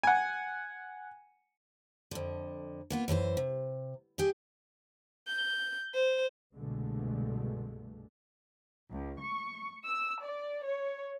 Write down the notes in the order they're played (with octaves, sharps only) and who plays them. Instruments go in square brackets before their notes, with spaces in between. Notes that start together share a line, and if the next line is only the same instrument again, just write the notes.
[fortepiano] F#5 G#5
[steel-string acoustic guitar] F2 D3
A#3 B3 F4
F#2 E3 G#4 C5
C3
G4 G#4 D#5
[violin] G6
C5
[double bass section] C2 G2 B2 D3 G#3 A3
[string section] C#2
C#6
E6
D5
C#5